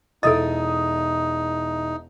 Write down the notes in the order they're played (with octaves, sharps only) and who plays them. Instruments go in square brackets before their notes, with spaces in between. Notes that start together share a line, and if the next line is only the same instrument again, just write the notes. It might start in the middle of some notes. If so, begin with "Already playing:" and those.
[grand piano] E1 E4 D#6 [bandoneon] D#4 [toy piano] A4 D#5